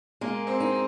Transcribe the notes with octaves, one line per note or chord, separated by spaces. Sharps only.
G#3 A#3
C4
D#4